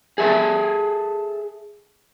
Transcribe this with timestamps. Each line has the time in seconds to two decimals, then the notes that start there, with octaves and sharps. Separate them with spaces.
0.18 G#4 A4 E5 G#5 A5